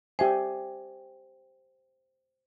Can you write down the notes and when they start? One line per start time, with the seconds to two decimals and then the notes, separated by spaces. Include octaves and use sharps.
0.19 G4 C5 E5 G5 G#5